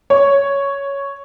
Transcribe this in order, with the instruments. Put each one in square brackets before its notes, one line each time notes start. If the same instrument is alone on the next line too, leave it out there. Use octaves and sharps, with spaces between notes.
[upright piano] C#5